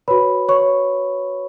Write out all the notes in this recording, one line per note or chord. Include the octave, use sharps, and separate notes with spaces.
F#4 B4 C#5 B5
C#5 C#6